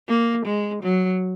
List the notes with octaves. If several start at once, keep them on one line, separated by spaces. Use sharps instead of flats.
A#3
G#3
F#3